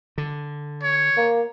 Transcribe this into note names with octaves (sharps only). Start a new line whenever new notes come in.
D3
C#5
A#3